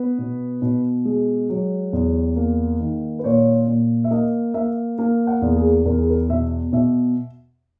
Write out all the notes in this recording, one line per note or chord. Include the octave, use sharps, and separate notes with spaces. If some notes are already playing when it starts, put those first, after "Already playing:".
Already playing: B3 B4
B2
B2
G#3
F#3
E2
A#3
D#3
B4
A#2 C#5
A#2
E5
A#3 D#5
A#3 E5
A#3
F#5
E2
G#4
E2 A#4
G#4
A#4
B2 E5
B2 E5